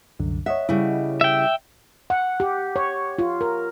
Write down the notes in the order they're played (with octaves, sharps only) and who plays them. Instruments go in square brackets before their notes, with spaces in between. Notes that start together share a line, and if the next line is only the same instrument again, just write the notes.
[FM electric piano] C2 F#2 D3
[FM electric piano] C#5 D#5 F#5 [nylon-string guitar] E5
[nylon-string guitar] C#3 G3 E4
[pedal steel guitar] E5 G5
[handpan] F#5
G4
C#5
F4
A#4